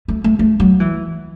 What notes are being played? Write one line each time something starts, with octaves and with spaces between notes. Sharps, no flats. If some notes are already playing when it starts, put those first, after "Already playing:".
A3
A3
A3
F#3
E3